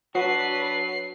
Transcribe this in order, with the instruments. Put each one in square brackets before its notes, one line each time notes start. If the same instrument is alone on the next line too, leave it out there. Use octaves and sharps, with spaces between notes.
[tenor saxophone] F#3 [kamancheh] D4 B4 [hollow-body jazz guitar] F#4 [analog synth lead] C7